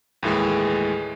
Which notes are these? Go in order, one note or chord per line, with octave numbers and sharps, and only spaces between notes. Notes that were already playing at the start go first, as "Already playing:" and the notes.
D#2 A2 E3 G#3